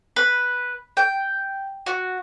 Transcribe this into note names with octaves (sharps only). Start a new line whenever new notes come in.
B4
G5
F#4